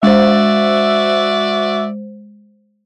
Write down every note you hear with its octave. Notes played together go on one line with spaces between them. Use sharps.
G#3 F#4 C5 D5 E5